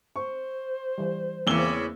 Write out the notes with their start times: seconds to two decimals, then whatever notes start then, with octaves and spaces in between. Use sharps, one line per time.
0.16 C5 C#6
0.98 E3 G3
1.47 E2 C#3 E3 A#3 C4 E6 G7